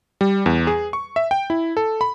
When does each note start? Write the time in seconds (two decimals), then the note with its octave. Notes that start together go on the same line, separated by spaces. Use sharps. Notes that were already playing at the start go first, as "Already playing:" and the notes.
0.21 G3
0.46 E2
0.67 G#4
0.93 C#6
1.16 E5
1.31 G5
1.50 E4
1.77 A4
2.01 B5